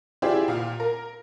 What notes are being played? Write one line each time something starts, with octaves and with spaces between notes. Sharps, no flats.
E4 F4 G4 G#4 C5 D5
A#2 F5
A#4